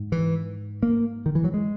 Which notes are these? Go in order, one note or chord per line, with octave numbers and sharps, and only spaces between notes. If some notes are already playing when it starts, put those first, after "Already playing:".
Already playing: G#2
E3
A#3
D#3
E3
F#3
G#3